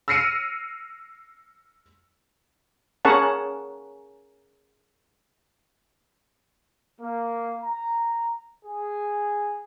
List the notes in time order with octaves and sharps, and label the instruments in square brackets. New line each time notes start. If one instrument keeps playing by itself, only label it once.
[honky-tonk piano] E6 F6 A#6 C7 C#7 D#7
[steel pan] C#4 G#4 A#4 C#5 F#5 A5
[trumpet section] A#3
A#5
G#4